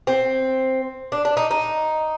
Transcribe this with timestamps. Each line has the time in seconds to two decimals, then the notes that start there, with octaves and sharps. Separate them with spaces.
0.07 C4
1.12 D4
1.25 D4
1.37 D#4
1.51 D#4